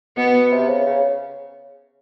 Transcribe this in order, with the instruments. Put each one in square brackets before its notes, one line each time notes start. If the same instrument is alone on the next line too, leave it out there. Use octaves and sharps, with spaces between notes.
[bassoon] B2 [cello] B3
[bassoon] C3
C#3
C#3